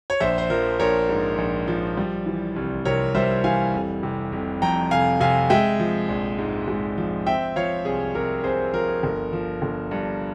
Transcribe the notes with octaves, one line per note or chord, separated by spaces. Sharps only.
C#5
A#1 C5 E5
C5
F3 A#4
A#1 A#4 C#5
G#2
A#1
F3
G3
E3
C2
C3 A#4 C#5
G3 C5 E5
E3 F5 G#5
F1
C3
F1
F2 G5 A#5
F1 F5 G#5
C3 F5 G#5
G#3 E5 G5
F3
A#1
G#2
G#3
F3
C4 E5 G5
F3 C#5 F5
C2 G#4
C3 A#4
C4 G#4 C5
F3 A#4
G1
F3
G1
G2